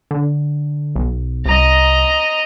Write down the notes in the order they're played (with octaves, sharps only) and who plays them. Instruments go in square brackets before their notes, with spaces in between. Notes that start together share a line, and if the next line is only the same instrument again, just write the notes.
[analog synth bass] D3
B1
[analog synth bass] C2 [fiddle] D#5 A#5